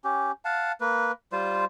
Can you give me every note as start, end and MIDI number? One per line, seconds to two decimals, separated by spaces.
0.04 0.32 61
0.04 0.32 67
0.45 0.72 77
0.45 0.72 78
0.45 0.72 81
0.81 1.12 58
0.81 1.12 71
1.32 1.65 55
1.32 1.65 65
1.32 1.65 72